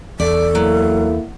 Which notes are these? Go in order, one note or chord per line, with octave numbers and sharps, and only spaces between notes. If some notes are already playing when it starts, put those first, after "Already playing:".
E2 A4 D5
F#3 A#3 E4